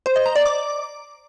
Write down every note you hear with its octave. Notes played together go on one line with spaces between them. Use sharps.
C5
D#5
A#5
D5
D6